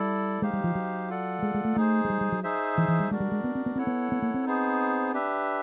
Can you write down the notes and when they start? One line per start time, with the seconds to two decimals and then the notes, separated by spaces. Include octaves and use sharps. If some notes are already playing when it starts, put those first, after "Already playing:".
Already playing: G3 E4 A4 D5
0.42 G#3 D#4 G4 C5 F5
0.53 G3
0.64 F3
0.75 F#3
1.09 F4 A4 D5 F#5
1.42 G#3
1.54 G#3
1.65 A3
1.76 A3 D#4 G#4 C5
2.05 G#3
2.10 G3
2.21 G3
2.32 F#3
2.44 D#4 G#4 C5 E5
2.78 E3
2.88 E3
2.99 G3
3.10 G#3 D4 F#4 A#4 D5
3.20 G3
3.32 G#3
3.44 B3
3.55 C4
3.66 B3
3.76 C4 E4 A4 C#5 F#5
3.87 B3
4.12 B3
4.22 A#3
4.34 C4
4.46 B3 D#4 G#4 C5
5.12 D4 G4 B4 E5